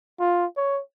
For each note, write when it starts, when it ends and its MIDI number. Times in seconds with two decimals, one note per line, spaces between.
0.20 0.46 65
0.57 0.81 73